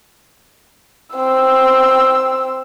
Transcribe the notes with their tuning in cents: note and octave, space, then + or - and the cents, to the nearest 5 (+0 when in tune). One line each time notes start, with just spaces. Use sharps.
C4 +0 E6 +0